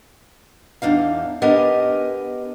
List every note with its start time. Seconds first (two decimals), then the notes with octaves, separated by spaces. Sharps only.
0.82 E2 D4 D#4 F5
1.42 B3 D4 G4 A#4 D#5 G#5